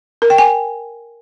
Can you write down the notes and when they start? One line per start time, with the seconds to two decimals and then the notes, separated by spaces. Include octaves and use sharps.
0.22 A#4
0.30 G5
0.38 G#5